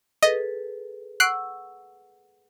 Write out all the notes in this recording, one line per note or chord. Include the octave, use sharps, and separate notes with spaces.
G#4 A4 B4 D#5
F#5 C#6 E6 F#6 C7 D7